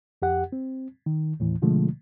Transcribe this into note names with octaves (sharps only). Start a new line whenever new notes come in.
F2 G4 F#5
C4
D#3
D#2 A2 E3
B2 D3 F3 G#3 A3